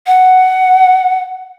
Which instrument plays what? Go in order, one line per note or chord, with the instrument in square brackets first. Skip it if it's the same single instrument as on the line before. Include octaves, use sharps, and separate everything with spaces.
[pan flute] F#5